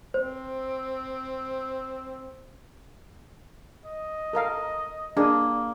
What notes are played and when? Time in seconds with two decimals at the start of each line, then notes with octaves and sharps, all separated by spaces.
0.14 C4 C5
3.86 D#5
4.33 A4 A#4 F5
5.17 A#3 D4 G#4